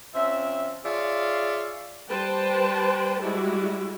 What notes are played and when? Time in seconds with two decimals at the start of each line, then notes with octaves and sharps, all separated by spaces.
0.15 F2 C4 C#4 E5
0.85 F4 G#4 C#5 D5 E5 F5
2.09 G3 B4 C5 G5 A5
3.21 G3 G#3 E4 F#4